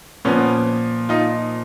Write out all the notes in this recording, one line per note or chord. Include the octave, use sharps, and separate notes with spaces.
A#2 F3 B3 C#4
D#4 F4